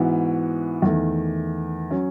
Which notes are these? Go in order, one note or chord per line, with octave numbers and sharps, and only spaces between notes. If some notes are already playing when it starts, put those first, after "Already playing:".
Already playing: G#2 E3 B3 F#4
E2 D#3 A3
F#3 C#4